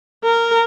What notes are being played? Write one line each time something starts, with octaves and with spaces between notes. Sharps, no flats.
A#4